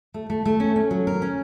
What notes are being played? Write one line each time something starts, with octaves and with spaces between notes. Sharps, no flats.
A3
A3
A3
C#4
C#4
F#3
A#4
C#4